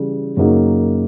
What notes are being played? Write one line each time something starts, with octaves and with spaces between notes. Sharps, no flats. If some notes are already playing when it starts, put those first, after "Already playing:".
Already playing: C#3 E3 G3
F#2 C#3 F#3 A#3 D#4